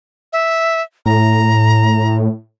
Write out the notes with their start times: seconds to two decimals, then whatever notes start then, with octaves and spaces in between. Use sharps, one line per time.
0.33 E5
1.06 A2 A#5